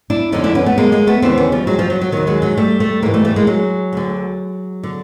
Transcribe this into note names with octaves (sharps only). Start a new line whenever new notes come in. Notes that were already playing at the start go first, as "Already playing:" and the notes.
D4 E4
F2 D3 C#4 D#4
D4 E4
B3 C#4
A3 B3
G#3 A#3
G#3 A#3
A3 B3
D#2 C#3 E3 C4 D4
B3 C#4
F3 G3
F#3 G#3
F3 G3
F#3
F#3
D#2 D#3 F#3
F#3 G#3
F#3 G#3
G3 A3
G3 A3
G#2 E3 G#3 A#3
G3 A3
G3 A3
G#3 A#3
F#3 G#3
D2 D3
D3